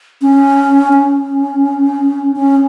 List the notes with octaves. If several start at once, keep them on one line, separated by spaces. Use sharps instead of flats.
C#4
C#4
C#4